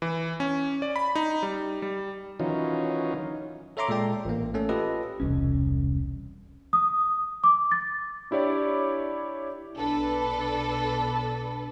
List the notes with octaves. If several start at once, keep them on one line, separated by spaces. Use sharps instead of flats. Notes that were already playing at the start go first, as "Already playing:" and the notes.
E3
C#4
D5
B5
D#4
G3
G3
D#3 E3 F#3 C#4 D#4 F4
A4 C#5 E5 A#5 C6 D6
A#2 G#3 A4 D5 G5
A1 A#3
A3 C#4 A4
F4 G4 A4 B4 D#5
E1 C2 C#4
D#6
D6
A6
D4 E4 G4 C#5 D5
B1 D4 A4 B4